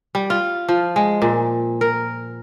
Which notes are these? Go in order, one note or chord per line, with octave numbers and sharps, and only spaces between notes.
G3
F4
F3
G#3
A#2
A#4